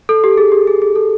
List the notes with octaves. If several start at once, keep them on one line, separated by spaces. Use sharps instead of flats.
A4
G4
G#4
G4
G#4
G#4
A4